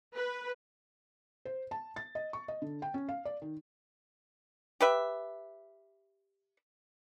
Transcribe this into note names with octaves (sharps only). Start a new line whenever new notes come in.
B4
C5
A5
A6
D#5
C#6
D#5
D3
G5
C#4
F5
D5
D#3
G4 B4 E5